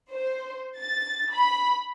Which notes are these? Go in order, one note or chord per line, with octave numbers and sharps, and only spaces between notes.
C5
A6
B5